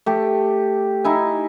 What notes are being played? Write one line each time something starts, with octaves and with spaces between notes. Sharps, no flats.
A3 G4
D#4 E4 G#5